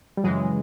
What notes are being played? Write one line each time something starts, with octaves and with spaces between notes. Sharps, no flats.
G3
F#2 C#3 E3 F#3 G#3